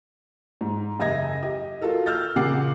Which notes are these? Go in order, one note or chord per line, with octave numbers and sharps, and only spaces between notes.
G#2
F#1 D#5 E5 G#6 A#6
G4 D#5
F4 F#4 A4 A#4
E6 F6 G6 A6
A#2 C#3 A#3 F#5 D6 C7